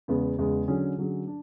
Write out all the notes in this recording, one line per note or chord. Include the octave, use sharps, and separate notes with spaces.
E2 C#3 G#3 B3
E2 C#3 G#3 B3
D3 F#3 C#4 G#4
D3 F#3 C#4 G#4
D4